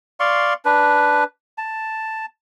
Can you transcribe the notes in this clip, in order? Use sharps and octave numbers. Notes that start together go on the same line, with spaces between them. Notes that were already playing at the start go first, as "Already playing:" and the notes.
D5 F5 C6 C#6
D4 B4
A5